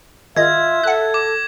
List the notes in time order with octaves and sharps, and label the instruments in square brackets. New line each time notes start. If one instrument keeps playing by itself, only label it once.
[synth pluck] G#1 D#5 [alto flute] F4 [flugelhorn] E5 [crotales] G#6
[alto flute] A4 [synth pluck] F#5 F#6
[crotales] D6